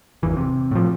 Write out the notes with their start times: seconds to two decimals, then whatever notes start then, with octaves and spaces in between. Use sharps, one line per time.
0.23 G#1 E2 E3
0.37 C3
0.71 A2 F3